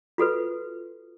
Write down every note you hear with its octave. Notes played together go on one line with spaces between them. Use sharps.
F4 F#4 A4 B4